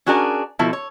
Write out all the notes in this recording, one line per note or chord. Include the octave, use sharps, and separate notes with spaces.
C#4 D4 F#4 G#4 A#4 D5
B2 F3 E4 A4
C#5